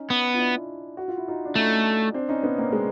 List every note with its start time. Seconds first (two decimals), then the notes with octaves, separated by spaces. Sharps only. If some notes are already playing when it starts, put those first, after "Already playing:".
Already playing: C#4 D#4
0.10 B3
0.34 F4
0.38 D4 E4
0.97 F#4
1.08 F4
1.17 E4
1.28 D#4 F4
1.45 D4
1.55 A3 C#4 D#4
2.14 C4 D4
2.29 C#4 D#4
2.43 B3 C#4
2.58 A#3 C4
2.72 G#3 A#3